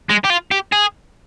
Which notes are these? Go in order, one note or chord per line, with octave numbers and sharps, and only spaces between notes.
G#3
G4
F4
G4
G#4